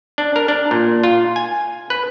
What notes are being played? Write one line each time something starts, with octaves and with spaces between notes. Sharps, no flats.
D4
A#4
D4
A#2
F4
G#5
B4